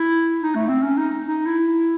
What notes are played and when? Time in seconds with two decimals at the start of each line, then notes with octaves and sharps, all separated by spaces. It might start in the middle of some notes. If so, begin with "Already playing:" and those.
Already playing: E4
0.42 D#4
0.55 A3
0.68 C4
0.82 C#4
0.97 D#4
1.25 D#4
1.46 E4